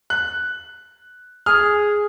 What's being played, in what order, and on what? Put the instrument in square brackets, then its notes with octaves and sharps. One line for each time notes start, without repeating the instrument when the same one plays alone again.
[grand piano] F#6
[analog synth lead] G#4 [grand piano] F6